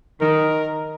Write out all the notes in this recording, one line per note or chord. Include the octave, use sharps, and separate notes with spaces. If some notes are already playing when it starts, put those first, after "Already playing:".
D#3 A#4